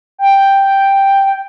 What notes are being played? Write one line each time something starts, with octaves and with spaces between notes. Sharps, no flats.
G5